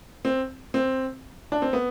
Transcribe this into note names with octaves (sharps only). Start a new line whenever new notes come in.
C4
C4
D4
C4
B3